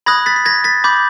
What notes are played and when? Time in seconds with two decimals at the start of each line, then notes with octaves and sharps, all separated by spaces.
0.06 B5 D#6 F#6 G#6 A#6
0.26 A6 B6
0.36 B6
0.45 G#6 A#6
0.64 A6 B6
0.84 B5 D6 G6